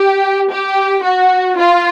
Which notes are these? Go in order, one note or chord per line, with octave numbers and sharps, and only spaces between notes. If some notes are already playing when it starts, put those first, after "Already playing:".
Already playing: G4
G4
F#4
F4